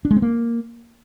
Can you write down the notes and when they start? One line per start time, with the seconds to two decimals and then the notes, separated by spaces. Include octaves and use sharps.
0.05 D4
0.11 G#3
0.16 C4
0.22 A#3